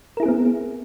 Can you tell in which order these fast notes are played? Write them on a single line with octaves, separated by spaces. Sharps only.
A#4 E4 G#4 C4 B3